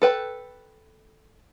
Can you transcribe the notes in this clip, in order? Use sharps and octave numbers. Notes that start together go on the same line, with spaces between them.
A4 B4 G5